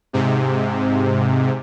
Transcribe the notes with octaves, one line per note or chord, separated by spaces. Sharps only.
G#2 C3